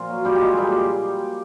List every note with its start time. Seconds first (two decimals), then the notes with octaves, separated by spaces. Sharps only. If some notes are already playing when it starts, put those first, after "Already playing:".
Already playing: A#2 F3 F4
0.10 F#3
0.25 A#2 G3 G4
0.35 G4
0.41 F#3 G#3 G#4
0.57 A#2 G3 G4